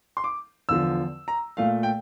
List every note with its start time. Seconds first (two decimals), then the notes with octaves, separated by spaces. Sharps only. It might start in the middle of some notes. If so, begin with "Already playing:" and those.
0.17 C6
0.24 D6
0.69 E2 D3 F3 E6
1.28 A#5
1.57 A#2 A3 F5
1.83 G5